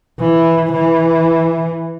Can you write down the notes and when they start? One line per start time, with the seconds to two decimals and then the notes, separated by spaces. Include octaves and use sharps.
0.20 E3
0.73 E3